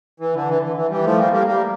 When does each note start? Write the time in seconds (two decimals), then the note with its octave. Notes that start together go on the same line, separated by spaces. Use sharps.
0.20 E3
0.34 D3
0.49 E3
0.63 E3
0.76 E3
0.90 E3 G3
1.05 F3 A3
1.19 G3 A#3
1.33 G3 A#3
1.47 G3 A#3